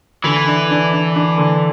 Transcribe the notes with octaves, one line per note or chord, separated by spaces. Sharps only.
D3 E3
D4
D4
D4
D4
D3